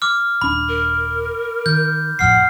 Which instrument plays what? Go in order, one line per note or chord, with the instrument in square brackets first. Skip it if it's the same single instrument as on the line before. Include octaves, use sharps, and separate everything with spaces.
[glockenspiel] D6 F6
[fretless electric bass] D#1 D4 [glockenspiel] B5
[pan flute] A#4
[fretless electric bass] D#3 [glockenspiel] G6
[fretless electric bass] A1 F2 A2 [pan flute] F#5 [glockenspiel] F6 C7